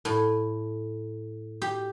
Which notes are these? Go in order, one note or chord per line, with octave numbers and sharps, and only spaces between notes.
A2
G4